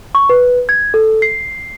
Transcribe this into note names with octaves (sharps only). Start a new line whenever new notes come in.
C#6
B4
G#6
A4
C7